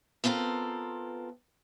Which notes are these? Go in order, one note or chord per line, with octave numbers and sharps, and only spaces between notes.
B3 C4 F4 A4 A#4